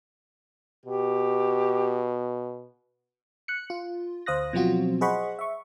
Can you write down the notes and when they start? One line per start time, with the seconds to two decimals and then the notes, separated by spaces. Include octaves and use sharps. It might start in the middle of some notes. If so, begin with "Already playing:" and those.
0.86 B2 G4
3.48 F#6 C#7
3.70 F4
4.26 D2 C5 F5 D#6 F#6 A#6
4.53 B2 F3 F#3 C4 F4 F#4
5.01 G#4 C5 D#5 F#5 B5 C#6
5.39 E5 C#6